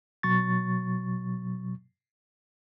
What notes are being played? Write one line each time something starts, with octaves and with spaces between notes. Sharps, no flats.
B2 F#3 C#6 A6